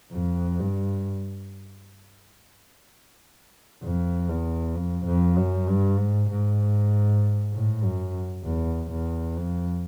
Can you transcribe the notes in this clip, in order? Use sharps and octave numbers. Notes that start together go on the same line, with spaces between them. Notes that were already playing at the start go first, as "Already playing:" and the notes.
F2
G2
F2
E2
F2
F2
F#2
G2
G#2
G#2
A2
F#2
E2
E2
F2